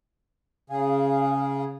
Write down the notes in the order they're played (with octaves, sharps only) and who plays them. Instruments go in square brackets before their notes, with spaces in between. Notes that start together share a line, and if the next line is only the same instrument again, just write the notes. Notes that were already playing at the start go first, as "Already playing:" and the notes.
[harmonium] C#3 G#4 [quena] F5